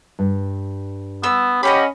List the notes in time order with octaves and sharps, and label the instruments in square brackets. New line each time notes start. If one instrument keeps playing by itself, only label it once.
[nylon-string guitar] G2
[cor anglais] B3 [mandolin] E6
[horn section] C#4 [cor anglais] G4 [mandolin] D#5 F#5 B5